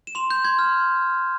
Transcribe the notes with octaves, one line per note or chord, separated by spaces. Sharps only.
E7
C6 F7
G6
C6 G#6
F6